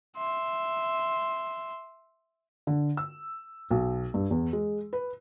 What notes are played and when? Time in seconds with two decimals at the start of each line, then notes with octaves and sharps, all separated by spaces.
0.17 E5 C6
2.67 D3
2.97 E6
3.71 B1
4.14 G2
4.31 E2
4.53 G#3
4.93 B4